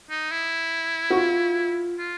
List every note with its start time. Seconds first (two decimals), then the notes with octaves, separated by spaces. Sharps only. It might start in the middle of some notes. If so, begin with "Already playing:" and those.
0.10 D#4
0.31 E4
1.10 F#4
1.16 F4
1.99 F4